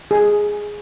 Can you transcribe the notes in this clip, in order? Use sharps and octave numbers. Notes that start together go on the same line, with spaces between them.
G#4